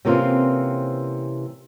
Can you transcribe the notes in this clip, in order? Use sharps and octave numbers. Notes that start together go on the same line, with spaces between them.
C3 E3 A#3 C4 C#4 F4